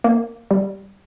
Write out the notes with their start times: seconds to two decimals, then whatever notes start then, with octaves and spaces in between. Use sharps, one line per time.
0.04 A#3
0.51 G3